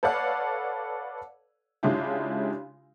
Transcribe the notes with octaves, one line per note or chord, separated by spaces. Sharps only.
A4 B4 C#5 D5 F5 F#5
C#3 G#3 D4 E4 F4 G4